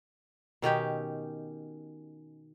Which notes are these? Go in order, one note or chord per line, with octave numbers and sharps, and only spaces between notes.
B2 D#3 C#4 G4